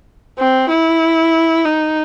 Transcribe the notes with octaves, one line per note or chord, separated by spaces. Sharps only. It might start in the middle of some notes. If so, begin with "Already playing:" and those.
C4
E4
D#4